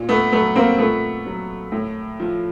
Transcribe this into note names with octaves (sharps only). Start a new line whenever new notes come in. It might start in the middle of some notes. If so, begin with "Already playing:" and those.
Already playing: A#2
A3 B3
F#3 A3 B3
A#3 C4
A#2 A3 B3
F#3
A2
F3